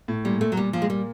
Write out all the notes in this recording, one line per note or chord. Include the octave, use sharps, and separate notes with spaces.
A2
A#2 G3
A#2 A3
F#3
A#2 G3
A#2 F3
G#3
G3 A#3